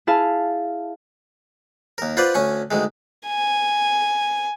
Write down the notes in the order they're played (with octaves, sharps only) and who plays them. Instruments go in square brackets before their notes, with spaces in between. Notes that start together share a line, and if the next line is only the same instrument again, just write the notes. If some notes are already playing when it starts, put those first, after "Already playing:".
[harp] E4 G#4 F5 A5
[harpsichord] D#2 A#4
F4 B4 C5 D5 F#5
D2 C#4 G#5 C#6
D2 D#3 G#3
[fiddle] G#5